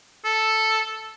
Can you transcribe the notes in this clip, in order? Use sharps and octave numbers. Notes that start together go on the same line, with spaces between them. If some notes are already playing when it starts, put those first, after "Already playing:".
A4